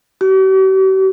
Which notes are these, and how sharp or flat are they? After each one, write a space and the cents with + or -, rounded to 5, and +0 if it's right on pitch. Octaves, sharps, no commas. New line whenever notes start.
G4 -45